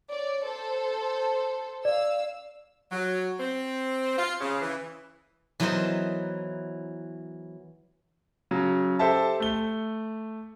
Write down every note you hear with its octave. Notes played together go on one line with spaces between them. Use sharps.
C#5 D5
A4 C5
D5 F5 E6
F#3
C4
F4
C#3
E3
E3 F#3 B3 A#4 C5 D#5
C#3 F#3
G4 A4 C5 E5 A5
A3 G7